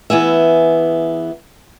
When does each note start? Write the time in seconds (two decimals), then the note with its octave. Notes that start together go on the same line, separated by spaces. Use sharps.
0.10 E3 B3 G#4 E5